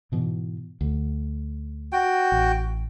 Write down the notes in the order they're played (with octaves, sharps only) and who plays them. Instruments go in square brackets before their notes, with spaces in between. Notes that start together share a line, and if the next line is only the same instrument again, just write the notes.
[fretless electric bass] G#2 B2 E3
D2
[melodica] F#4 G5
[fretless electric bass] A1